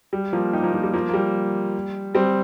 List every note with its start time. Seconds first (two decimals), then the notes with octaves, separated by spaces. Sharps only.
0.13 G3
0.33 F3 A#3
0.53 D#4 G4
0.63 F3 A#3
0.74 F3
0.83 G3
0.94 F3 A#3
1.09 A#3
1.14 G3
2.15 G3 C4